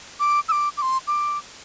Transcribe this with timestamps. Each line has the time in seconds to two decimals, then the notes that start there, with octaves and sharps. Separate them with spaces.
0.20 D6
0.48 E6
0.52 D6
0.77 D6
0.82 C6
1.07 D6